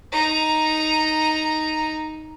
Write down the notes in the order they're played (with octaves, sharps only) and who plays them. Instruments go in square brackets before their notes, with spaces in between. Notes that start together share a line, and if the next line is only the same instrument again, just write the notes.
[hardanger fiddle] D#4 A#5